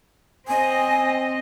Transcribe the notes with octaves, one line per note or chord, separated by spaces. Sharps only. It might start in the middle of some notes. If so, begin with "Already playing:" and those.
C4 D#5 G#5